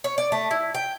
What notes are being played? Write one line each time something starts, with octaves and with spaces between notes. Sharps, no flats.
C#5
D5
A3
E4
G5